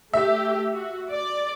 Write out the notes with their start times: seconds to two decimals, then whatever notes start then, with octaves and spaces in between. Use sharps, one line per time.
0.13 A3 G4 E5
0.72 F#4
1.10 D5